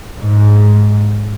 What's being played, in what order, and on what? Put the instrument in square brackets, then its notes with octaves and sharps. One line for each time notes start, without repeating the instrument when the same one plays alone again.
[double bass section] G#2